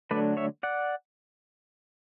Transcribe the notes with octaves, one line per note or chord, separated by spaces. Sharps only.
D3 F#3 A3 D4 B4 D5
C#5 E5
D5 F#5